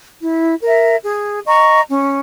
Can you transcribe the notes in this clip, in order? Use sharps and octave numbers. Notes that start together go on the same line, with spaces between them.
E4
A#4 E5
G#4
D#5 A#5 C#6
C#4